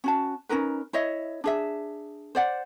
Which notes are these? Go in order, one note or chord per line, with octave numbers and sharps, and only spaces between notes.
C#4 F#4 A5
C#4 D#4 A#4 B4
E4 C#5 D#5 E5
D4 G#4 E5
C5 D5 F#5